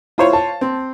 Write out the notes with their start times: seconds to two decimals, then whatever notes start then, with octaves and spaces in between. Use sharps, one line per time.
0.18 E4 F4 C5 C#5
0.33 A5
0.61 C4